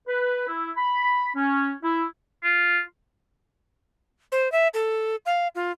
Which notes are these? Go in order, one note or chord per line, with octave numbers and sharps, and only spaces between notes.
B4
E4
B5
C#4
E4
F4
C5
E5
A4
F5
F4